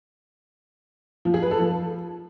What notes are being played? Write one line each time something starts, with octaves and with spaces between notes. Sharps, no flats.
F3
G#4
B4
A4
F3